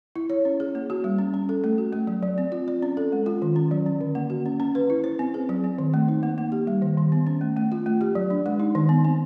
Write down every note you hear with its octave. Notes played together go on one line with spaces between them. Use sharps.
E4
C#5
C#4
G#4
A#3
F#4
G3
C#4
C#4
A4
A3
F#4
A3
F#3
F#3
C4
F4
D5
C#4
A4
G#3
F4
D#3
C#4
F#3
C#4
D3
A#3
F#4
C#4
C#4
B4
E4
C5
C4
G#4
F#3
C4
D#3
A3
D#4
A#3
A#3
G4
G3
D#3
D#3
B3
C#4
A3
A3
F4
A3
G4
F#3
D4
G#3
D#4
D#3
B3
C4